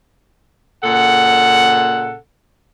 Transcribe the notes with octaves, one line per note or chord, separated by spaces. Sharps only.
A#2 C#3 A4 F#5